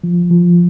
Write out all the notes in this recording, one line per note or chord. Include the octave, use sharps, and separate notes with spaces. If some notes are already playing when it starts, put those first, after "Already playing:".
F3
F3